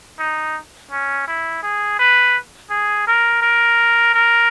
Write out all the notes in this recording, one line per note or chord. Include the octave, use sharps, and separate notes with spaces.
D#4
C#4
E4
G#4
B4
G#4
A#4
A#4
A#4